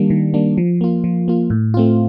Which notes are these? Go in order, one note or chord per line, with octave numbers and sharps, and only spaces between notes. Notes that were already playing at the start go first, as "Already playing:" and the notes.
Already playing: D#3 G3 A#3 D4
D#3
G3 A#3 D4
F3
A#3 F4
F3
A#3 F4
A2
A3 C4 F4